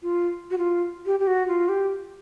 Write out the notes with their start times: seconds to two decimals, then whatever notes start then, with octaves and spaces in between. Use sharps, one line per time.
0.03 F4
0.51 F#4
0.58 F4
1.06 G4
1.20 G4
1.27 F#4
1.48 F4
1.69 G4